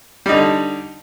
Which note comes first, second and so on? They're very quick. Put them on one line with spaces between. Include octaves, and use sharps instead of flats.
G3 D#4 D3